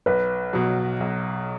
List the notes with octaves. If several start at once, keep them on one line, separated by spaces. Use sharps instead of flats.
B1 B4
B2 F#3
B1